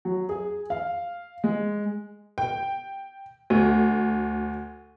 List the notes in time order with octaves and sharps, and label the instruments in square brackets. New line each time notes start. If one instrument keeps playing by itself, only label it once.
[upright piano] F#3
G#4
F5
G#3
[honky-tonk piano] G5
D2